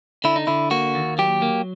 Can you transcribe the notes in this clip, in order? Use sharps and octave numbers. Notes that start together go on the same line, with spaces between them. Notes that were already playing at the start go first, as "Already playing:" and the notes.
D3 E4
D#4
D3 E4
A#3 F#4
D#2
F#3 G4
A#3